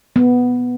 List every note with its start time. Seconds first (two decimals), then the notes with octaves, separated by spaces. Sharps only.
0.16 B3